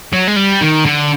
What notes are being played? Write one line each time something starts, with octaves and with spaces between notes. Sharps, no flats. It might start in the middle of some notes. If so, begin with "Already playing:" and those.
F#3
G#3
G3
D#3
D3